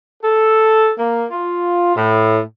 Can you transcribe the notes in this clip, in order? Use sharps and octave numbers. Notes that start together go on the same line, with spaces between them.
A4
A#3
F4
A2